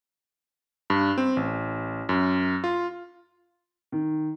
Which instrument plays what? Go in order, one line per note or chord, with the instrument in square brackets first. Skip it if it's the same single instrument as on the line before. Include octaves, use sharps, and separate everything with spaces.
[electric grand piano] G2
C4
A1
F#2
F4
[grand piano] D#3